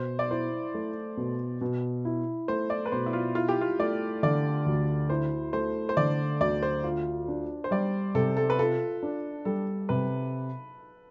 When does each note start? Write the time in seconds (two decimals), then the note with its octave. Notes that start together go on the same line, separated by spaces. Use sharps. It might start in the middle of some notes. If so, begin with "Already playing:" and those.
Already playing: B2 C5
0.19 D5
0.30 E4 C5
0.75 A3
1.17 B2
1.61 B2
2.05 E4
2.48 A3 C5
2.70 D5
2.86 B4
2.92 B2 C5
3.06 E4
3.13 F4
3.35 E4 F4
3.48 G4
3.61 F4
3.79 A3 D5
4.23 D3 D5
4.66 D2
5.10 E4 C5
5.53 A3 C5
5.89 C5
5.97 D3 D5
6.40 D2 D5
6.63 C5
6.84 F4
7.28 D4
7.64 C5
7.71 G3 D5
8.15 C3 A4
8.37 A4
8.50 B4
8.58 F4 A4
9.03 D4
9.45 G3 A4
9.89 C3 B4